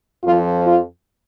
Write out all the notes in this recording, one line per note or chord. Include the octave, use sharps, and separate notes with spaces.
F2 F3 F4
F4